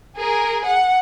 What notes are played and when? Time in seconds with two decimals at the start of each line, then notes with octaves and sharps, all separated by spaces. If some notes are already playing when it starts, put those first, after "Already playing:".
0.17 G#4 A#4
0.66 F#5